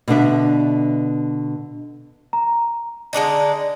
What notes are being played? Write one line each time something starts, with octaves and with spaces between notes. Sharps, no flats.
B2 D3 D4 E5
A#5
D3 G#3 D4 D#4